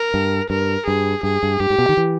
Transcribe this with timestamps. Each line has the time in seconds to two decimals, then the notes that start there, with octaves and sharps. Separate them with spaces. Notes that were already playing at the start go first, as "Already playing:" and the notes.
Already playing: A#4
0.14 G2
0.50 G2 A#4
0.87 G2 G#4
1.23 G2 G#4
1.43 G2
1.60 G2 G4
1.70 G#2
1.79 B2
1.89 D#3
1.97 E3